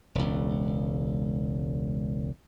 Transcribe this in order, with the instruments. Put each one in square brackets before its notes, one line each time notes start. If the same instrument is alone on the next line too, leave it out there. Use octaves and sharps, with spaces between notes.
[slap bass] E1 C#2